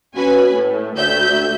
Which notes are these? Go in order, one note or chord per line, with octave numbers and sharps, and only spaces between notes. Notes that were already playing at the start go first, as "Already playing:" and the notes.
C#4 F#4 B4 G#5
A2 A3
D2 E5 G6